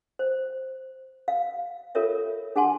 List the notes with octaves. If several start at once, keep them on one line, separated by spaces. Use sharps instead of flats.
C5
F5
F4 A4 A#4 C#5 E5
D4 G#4 F#5 G#5 A5 C6